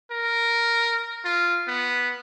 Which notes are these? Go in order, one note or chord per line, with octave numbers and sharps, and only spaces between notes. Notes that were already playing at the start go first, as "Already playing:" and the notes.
A#4
F4
B3